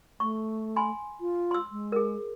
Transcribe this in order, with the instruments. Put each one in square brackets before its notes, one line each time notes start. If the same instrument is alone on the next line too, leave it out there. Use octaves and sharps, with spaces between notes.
[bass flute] A3 [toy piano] C#6
[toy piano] G#5 B5 C6
[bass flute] F4
[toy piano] C6 E6
[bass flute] G#3
[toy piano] G#4 A#4